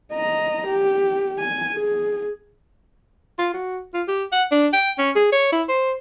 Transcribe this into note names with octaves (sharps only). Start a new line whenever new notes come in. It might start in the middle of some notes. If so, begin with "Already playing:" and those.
D#5 A#5
G4
G#5
G#4
F4
F#4
F4
G4
F#5
D4
G5
C#4
G#4
C#5
E4
C5